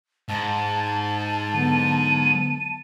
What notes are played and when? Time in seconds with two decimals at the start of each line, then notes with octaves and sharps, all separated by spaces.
0.29 G#2 A5
1.54 D3 F#3 B3 D#7